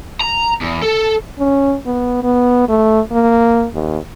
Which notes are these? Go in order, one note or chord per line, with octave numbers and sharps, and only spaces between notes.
A#5
E2
A4
C#4
B3
B3
A3
A#3
D#2